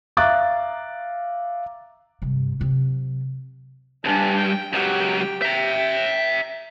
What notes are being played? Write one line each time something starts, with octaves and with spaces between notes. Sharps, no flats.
E5 F5 A#5 D6 F#6 A6
G2 C3
C3 F#3
C#2 G2 D4 G#5
G5
C#2 F#3 G4 G5
E5 G5 A#5